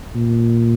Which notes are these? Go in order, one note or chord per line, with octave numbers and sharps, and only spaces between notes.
A#2